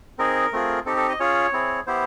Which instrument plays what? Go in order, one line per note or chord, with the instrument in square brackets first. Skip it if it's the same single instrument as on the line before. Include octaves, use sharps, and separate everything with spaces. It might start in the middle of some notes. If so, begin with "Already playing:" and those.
[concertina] C4 D#4 G#4 A#4
A3 C4 F4 G#4
C4 D#4 G4 A4
A4
D#5
C#4 F4 G#4 C#5
C4 E4 G#4
B3 E4 G4 C5